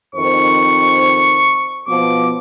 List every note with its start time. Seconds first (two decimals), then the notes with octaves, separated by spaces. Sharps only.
0.15 F2 D#3 C5 C#6
1.87 B2 F3 B3 D6